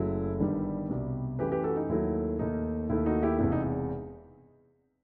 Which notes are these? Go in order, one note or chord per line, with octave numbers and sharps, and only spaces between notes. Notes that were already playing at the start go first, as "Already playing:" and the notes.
Already playing: F#1 F#2 F#3 A3 E4
G1 G2 D#3 G3
C2 B2 G3
F#2 E3 A3 G4 B4
G4 B4
F#4 A4
D#4
D#2 D#3 F#3 A3 E4
D#2 D#3 A3 D#4
D#2 D#3 A3 E4
D#4 F#4
E4 G4
E1 E2 C3 E4
D#4